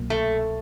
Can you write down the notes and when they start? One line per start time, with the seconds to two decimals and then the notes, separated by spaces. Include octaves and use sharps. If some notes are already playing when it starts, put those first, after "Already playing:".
Already playing: C2 B2 F#3 A#3
0.10 A3